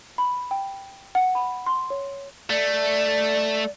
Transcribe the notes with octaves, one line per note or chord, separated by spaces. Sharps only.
B5
G5
F#5
B5
C6
C#5
A3 D5